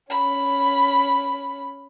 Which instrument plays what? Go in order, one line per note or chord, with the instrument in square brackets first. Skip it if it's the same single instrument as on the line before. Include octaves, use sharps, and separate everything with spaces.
[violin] C#4 B5